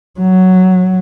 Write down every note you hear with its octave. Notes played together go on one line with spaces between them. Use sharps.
F#3